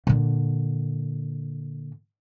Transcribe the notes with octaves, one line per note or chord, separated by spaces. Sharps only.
A#2 D3